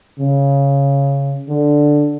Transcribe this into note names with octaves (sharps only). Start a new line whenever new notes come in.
C#3
D3